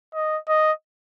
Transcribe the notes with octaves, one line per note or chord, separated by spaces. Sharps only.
D#5
D#5